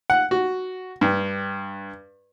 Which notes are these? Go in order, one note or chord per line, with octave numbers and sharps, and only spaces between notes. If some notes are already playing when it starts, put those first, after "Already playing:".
F#5
F#4
G2